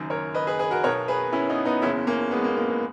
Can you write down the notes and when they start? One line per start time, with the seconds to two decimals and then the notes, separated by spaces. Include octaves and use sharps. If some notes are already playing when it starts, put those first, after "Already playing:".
Already playing: F#1 F#2 D#3
0.10 A#4 C#5
0.34 B4 D#5
0.47 G#4 B4
0.59 G#4 B4
0.71 F#4 A#4
0.84 B2 A#4 C#5
0.87 B1
1.08 G#4 B4
1.32 C#4 E4
1.49 B3 D#4
1.65 B3 D#4
1.82 F#1 E2 C#3 C#4 E4
2.07 A#3 C#4
2.31 G#3 B3
2.44 A#3
2.56 A#3
2.68 G#3 B3